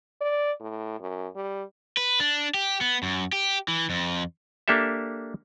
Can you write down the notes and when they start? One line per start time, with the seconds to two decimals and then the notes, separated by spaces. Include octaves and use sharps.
0.21 D5
0.60 A2
1.00 F#2
1.36 G3
1.97 B4
2.20 D4
2.54 G4
2.81 B3
3.03 F#2
3.33 G4
3.68 E3
3.90 F2
4.68 A#3 D4 G4 A4 E5